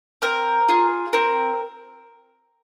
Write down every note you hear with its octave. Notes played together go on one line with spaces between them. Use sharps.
C4 A#4
F4 G#4
C4 A#4